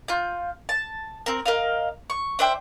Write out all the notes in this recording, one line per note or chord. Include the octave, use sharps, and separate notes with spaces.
F4 G6
A5
C4 A#4
A#4 D#5 F5
C#6
D4 C5 E5 G5